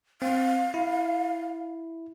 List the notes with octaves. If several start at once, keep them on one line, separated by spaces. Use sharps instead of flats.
C4 F5
E4